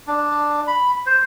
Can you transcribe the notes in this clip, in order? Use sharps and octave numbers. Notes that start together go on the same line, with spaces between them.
D4
B5
C5